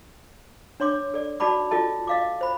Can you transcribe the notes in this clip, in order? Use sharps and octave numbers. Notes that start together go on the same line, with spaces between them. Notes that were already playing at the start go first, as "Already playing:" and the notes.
D4 C#5 C6 D6
A4 D5
D#4 F#4 D5 A5 B5 D6
F4 A4 D#5 A5
D#5 F5 D6
C5 B5